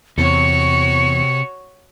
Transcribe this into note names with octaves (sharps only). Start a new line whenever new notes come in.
E2 C3 F#4 C#5 C#7